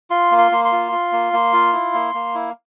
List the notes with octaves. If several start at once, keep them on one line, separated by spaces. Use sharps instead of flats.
F4 C6
A#3
C6
A#3
C6
F4
F4
A#3
A#3
F4
E4
A#3
A#3
E4